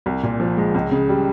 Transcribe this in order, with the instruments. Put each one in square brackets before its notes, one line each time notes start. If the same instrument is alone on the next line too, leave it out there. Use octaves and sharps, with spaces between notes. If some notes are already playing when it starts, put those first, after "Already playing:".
[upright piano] C2
A#2
F3
G#3
C#2
C#3
G3